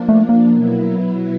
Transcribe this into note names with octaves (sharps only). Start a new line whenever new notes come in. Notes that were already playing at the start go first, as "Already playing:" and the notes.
Already playing: F3 A#3 D4
A3
A#3
B2 F#3 B3 E4